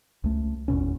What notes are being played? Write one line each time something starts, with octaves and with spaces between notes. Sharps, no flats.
C#2 A3
G#1 E2 B2 C#4